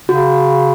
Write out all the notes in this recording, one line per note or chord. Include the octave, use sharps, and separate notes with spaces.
C#3 F#4